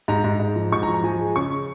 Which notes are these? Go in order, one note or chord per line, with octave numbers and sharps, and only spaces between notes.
G#2 A#5
G#2
G#2
F3
G#2 C#6
A#5
F3
A#5
F3 G#5
G#3
C#3 C#6